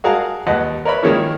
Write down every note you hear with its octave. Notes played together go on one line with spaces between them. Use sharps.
F#4 G#4 A#4 F5 A5
D#2 B4 D#5 F#5 A5
A#4 B4 C#5 D5 E5 B5
D#3 F3 G#3 A#3 C#4 E4